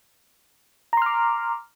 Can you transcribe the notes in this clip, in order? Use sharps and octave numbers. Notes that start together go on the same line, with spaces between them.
A#5 C6 D6 F6